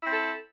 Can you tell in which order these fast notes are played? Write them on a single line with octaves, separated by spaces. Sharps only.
E4 C4 A4